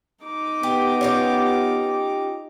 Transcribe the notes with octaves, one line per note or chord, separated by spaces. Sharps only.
D#4 D6
B3 G4
C#4 F4 G4